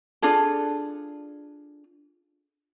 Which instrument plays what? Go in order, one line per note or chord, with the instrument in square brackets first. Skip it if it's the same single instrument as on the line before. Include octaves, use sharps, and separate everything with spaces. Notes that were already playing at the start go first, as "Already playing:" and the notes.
[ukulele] D4 F4 G#4 A4